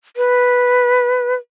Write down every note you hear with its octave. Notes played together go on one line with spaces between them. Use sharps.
B4